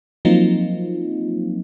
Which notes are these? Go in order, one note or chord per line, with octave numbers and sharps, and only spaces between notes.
F3 F#3 A#3 C4 D#4 F4